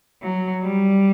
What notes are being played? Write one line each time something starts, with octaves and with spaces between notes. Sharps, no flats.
F#3
G3